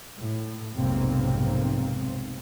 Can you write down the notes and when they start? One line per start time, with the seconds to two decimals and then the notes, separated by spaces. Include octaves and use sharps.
0.21 A2
0.74 F1 B1 G#2 A#3 C4